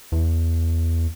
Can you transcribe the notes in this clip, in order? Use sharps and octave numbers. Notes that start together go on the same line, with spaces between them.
E2